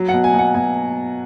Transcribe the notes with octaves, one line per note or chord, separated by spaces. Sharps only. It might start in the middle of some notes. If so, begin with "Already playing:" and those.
Already playing: F#3
F#5
B2
G#5
B2 F#5
B2 G#5